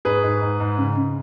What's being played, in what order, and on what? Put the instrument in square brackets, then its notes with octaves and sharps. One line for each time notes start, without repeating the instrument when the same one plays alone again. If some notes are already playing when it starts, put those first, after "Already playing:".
[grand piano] G#2 G#4 B4
G#2
G#2
G#2
C#3
C#3